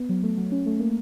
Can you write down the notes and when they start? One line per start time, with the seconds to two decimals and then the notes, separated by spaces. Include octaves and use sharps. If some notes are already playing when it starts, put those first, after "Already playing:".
Already playing: B3
0.09 F#3
0.23 A3
0.37 F#3
0.52 C#4
0.66 A3
0.80 A#3